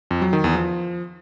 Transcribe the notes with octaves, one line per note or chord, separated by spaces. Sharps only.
F2
F#3
D#3
E2
F3